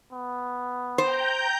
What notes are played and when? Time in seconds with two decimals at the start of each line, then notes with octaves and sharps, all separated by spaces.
0.12 B3
0.98 C5 G5 A#5 G6